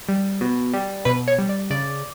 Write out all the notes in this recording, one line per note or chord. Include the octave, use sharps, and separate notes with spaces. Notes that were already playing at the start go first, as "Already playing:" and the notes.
G3
B2
G3
B2 B4
C#5
G3
D5
C#3 D5